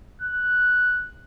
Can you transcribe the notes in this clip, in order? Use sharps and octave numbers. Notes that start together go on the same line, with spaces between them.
F#6